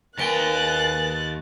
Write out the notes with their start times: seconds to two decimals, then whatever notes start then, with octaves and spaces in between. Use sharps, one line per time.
0.18 D#2 A#4 B4 G5 G#5 F#6 A6